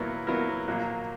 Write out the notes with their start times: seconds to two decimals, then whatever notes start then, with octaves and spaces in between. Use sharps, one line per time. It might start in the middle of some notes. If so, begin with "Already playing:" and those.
Already playing: A#2 F#3 B3 E4 A#4
0.27 A#2 F#3 B3 E4 A#4
0.67 A#1 A#2 F#3 A#3